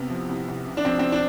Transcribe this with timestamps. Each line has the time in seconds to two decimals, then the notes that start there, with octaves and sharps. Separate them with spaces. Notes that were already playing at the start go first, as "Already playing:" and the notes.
Already playing: C2 C3 B3
0.10 F3
0.29 C2
0.48 C2
0.66 C3
0.77 D4
0.85 F3 C4
0.99 C4
1.12 D4